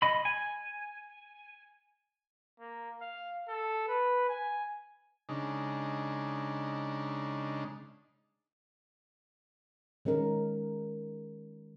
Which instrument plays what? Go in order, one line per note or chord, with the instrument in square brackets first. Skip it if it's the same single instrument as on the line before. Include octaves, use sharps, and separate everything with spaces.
[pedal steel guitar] D#5 B5
G#5
[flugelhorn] A#3
F5
A4
B4
G#5
[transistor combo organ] C#3 G#3 D4 D#4
[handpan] D#3 G#3 C#4 A#4